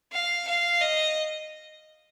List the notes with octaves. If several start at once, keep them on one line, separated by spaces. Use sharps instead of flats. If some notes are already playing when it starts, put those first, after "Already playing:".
F5
F5
D#5